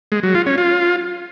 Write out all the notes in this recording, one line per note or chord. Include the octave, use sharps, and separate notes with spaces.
G#3
F#3
F4
C#4
F4